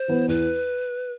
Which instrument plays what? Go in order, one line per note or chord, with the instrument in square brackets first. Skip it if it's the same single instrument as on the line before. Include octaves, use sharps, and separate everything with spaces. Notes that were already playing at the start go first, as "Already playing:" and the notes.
Already playing: [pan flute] C5
[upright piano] E3 B3
[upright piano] E2 [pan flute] B4